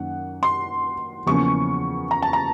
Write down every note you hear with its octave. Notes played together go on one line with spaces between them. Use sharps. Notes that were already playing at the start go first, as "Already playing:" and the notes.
Already playing: F#2 D#3 F#3 A#3 C#4 F#5
C6
E2 C#3 F3 A#3 C#4 C#6
A#5
A5
A#5